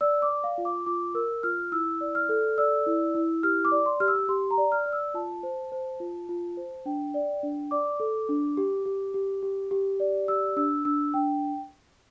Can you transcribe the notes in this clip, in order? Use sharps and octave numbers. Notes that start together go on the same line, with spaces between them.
D5 E6
D6
D5
F5
F4
D6
F4 D6
A#4 E6
F4 F6
E4 E6
D5
F6
A4
D5 E6
E4
E4
G4 F6
D6
D5
C6
G4 F6
E6
G4 C6
A#5
D5
F6
D5
E6
F4 A5
C5
C5
F4
F4
C5
D4 G5
D5
D4
D5 D6
A4
D4
G4
G4
G4
G4
G4
D5
G4 E6
D4 E6
D4 E6
D4 G5